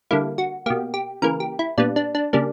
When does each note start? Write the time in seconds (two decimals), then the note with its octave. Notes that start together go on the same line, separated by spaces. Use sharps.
0.11 D3 G3 A#3 E4
0.38 F#4
0.66 B2 A#3 G4
0.94 G4
1.22 C#3 E3 A#3 A#4
1.40 G4
1.59 E4
1.78 A#2 G3 B3 D4
1.96 D4
2.15 D4
2.33 C#3 G3 A#3 D4